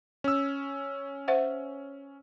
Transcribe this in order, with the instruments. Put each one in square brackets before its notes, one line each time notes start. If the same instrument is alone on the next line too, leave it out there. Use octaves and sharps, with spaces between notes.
[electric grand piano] C#4 E6
[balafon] C5 E5 F#5